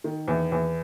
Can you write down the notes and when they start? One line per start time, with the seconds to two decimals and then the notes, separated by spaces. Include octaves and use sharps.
0.04 D#3
0.28 E2
0.52 E2